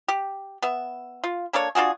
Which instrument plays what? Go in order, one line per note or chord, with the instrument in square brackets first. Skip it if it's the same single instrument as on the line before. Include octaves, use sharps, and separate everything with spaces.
[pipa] G4
B3 E5
F4
A#3 D4 A4 C#5
D4 F4 F#4 G#4